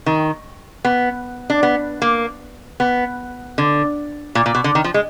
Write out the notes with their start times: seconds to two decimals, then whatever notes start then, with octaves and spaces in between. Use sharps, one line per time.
0.06 D#3
0.85 B3
1.50 D4
1.63 B3
2.02 A#3
2.80 B3
3.58 D3
4.35 A#2
4.46 A#2
4.55 B2
4.64 D3
4.75 D#3
4.84 F3
4.94 G#3